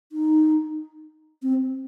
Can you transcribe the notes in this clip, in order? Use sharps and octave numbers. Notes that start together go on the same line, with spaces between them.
D#4
C4